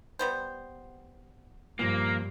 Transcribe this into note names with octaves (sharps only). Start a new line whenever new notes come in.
G3 B3 C5
G2 A#2 F3 A#3